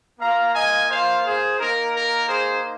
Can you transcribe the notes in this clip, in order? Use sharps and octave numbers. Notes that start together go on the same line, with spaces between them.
A#3 F4 F5 A#5
D#5 G#5
C5 F5
G#4 C5
A#3 D#4 A#4
A#4
G#4 C5